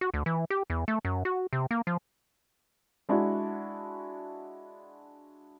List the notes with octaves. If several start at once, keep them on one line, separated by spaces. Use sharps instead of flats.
F#4
D2
E3
G4
E2
A3
F#2
F#4
C3
A#3
F3
G#3 D4 E4 F#4